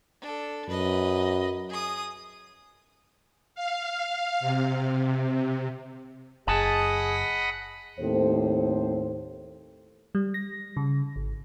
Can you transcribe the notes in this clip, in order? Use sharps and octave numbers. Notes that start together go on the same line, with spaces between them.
D4 A4
F#2 B4 D#5
G#4 D#6
F5
C3
F#1 G#4 D#5 F#5 G#5 A5 B5
D#2 A2 C4 A4 C5
G3
A#6
C#3
G#1